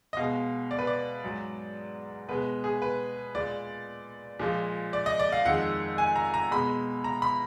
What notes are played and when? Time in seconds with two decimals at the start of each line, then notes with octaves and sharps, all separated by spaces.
0.13 D#5
0.17 B2 G#3 F5
0.71 D5
0.78 B4
0.87 D5
1.23 G#2 F#3
2.28 B2 G#3 B4
2.64 G#4
2.82 B4
3.35 A#2 G#3 D5
4.40 A#2 F3 G#3
4.93 D5
5.06 D#5
5.20 D5
5.32 F5
5.45 F2 D#3 G#3 F#5
5.98 G#5
6.16 A#5
6.34 A#5
6.51 B2 G#3 B5
7.04 A#5
7.22 B5